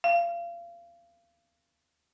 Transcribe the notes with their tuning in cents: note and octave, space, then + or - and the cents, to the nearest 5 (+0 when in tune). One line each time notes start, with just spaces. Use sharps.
F5 -30